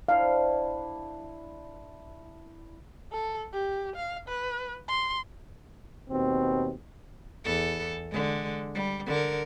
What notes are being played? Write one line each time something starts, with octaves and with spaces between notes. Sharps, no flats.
D4 E4 C5 F5
A4
G4
F5
B4
C6
D#2 B2 C4
E2 A4
D3 G#3
G3
D3 A#4